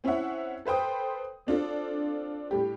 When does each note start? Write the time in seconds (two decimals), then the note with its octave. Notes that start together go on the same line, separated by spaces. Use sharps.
0.04 C4 C#4 E4 C#5 E5 F#5
0.65 A4 B4 C5 G5 D#6
1.47 C4 D4 F4 A4
2.51 A2 G3 G4